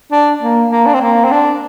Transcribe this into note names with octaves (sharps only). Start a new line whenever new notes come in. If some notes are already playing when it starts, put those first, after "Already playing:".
D4
A#3
A#3
D4
C4
A#3
C4
D4